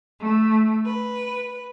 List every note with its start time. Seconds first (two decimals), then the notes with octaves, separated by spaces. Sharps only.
0.19 A3
0.85 B4